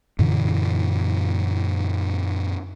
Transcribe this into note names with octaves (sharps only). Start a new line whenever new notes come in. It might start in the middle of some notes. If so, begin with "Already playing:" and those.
F#2 A#2 D3 E3